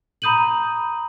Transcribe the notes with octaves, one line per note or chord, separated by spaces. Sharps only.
A#5 B5 D#6 G6 D#7 F#7